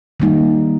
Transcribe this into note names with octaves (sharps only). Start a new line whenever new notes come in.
D#3 G3 A#3 D#4